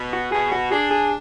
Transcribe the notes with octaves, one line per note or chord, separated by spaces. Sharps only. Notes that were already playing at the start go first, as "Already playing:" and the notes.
Already playing: B2
F#4
B2 G#4
F#4
D4 G#4
G#4